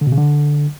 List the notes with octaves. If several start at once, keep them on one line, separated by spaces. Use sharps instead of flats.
D3
B2
C#3
D3